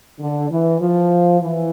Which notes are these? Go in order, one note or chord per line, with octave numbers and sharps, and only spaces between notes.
D3
E3
F3
E3